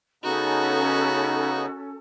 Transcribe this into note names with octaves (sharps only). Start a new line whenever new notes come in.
C#3 B3 C#4 D#4 F#4 A4